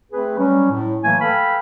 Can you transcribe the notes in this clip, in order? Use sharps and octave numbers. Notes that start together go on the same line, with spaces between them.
A3 C4 G#4 B4
F#3 G3 C#4
A2
E3 F#3 A3 A#3 G#5
A4 B4 F5 G5 A5 B5